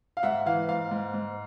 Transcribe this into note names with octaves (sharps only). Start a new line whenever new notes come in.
F5
G#2 E5 F#5
E3 F5
G#2 F5
G#2
G#2